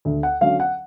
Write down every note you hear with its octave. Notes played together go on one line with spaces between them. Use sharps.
D2
F#5
D3 F#3 C#4 F5
F#5